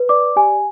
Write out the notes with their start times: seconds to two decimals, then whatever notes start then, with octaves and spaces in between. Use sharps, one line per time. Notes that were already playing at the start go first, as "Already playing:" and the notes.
Already playing: B4
0.09 D5 D6
0.36 G4 G#5